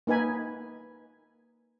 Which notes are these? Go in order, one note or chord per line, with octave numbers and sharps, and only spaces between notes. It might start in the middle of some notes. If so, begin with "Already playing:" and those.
A#3 D#4 B4 G#5 B5